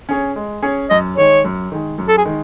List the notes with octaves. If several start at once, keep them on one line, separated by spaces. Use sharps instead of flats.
C#4 G#4 C#5
G#3
C#4 G#4 C#5
F#2 D#5
D#3 G#3 C#5
F#2
D#3 G#3
F#2
A4
G#4
D#3 G#3